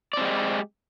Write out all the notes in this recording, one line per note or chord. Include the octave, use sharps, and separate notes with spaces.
G#3 C4 G4 D5